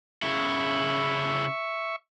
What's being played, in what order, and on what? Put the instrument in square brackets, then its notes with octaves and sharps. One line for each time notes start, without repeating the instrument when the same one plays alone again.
[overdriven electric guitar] C#3 E4 [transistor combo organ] E5 C#6